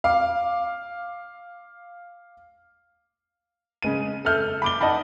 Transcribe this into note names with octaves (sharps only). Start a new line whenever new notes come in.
F5 D6
C#3 G#3 D#7
A4 E5 F6 G6
B5 D6 G7
D#4 D#5 F#5 A5 B5